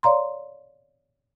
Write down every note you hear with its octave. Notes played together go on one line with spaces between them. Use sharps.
C#5 D5 F5 A#5 C6